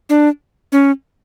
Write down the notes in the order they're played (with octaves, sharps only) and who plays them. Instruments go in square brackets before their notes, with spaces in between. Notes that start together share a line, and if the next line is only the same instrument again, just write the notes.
[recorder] D4
C#4